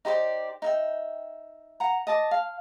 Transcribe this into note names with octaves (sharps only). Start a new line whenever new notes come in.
D#4 G4 C5 D5
D#4 E5 G5
F#5 A#5
D#5 A5 D6
F5